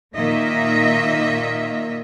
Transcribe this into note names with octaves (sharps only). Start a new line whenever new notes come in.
A#2 D#3 A#3 D#5 E5